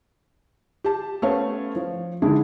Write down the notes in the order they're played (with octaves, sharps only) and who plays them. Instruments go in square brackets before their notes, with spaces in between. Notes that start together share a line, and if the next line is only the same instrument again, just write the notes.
[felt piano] G4 A5
A3 B3 C#4 C5 C#5 F5
F3
D3 D#3 G#3 D4 E4 G#4